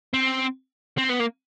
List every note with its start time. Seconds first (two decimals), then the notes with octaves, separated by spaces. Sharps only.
0.14 C4
0.98 C4
1.10 B3
1.20 A#3